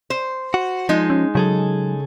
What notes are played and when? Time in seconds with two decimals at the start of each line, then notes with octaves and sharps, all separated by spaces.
0.10 C5
0.54 F#4
0.89 F3 G#3 D#4
1.10 C#4
1.35 C#3 F#3 G#4 A4